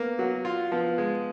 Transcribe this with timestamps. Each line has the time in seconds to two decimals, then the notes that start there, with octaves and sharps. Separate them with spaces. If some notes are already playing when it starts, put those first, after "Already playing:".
Already playing: A#3 B3
0.19 F#3
0.45 F4
0.72 F3 B3
0.98 G#3